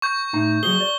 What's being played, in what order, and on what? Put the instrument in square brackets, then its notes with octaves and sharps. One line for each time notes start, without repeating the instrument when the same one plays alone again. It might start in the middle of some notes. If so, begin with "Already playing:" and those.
[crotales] C#6 G6
[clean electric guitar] A2 D#4 A#5
[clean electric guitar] F#3 F#4 G#4 [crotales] G7
[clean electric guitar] D5